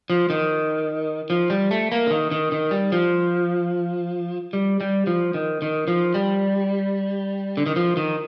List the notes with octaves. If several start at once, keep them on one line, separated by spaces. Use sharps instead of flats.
F3
D#3
F3
G3
A3
A#3
D3
D#3
D#3
D#3
G3
F3
G3
G3
F3
D#3
D#3
F3
G3
D3
D#3
F3
D#3